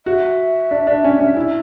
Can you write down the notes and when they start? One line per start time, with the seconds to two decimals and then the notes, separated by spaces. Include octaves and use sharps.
0.06 F#4 E5
0.71 D4
0.87 D4
1.04 C#4
1.19 C#4
1.37 E4